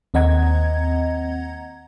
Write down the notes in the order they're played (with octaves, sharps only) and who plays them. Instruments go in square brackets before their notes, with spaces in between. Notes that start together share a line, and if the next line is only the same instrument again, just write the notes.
[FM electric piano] D#2 C4 D#5 F#5 A#5 G#6